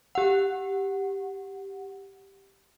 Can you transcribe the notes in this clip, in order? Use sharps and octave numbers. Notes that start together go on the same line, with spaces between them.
G4 F#5